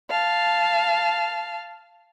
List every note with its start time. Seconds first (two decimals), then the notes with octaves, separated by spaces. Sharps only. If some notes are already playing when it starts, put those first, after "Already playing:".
0.10 F5 A5